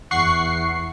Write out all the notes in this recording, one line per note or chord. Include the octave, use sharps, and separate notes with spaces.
E2 F#5 C#6 C7